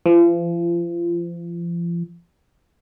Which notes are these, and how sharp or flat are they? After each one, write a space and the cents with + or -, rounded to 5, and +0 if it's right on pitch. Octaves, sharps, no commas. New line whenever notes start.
F3 -35